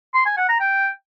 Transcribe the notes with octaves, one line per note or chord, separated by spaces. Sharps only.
C6
G#5
F#5
A#5
G5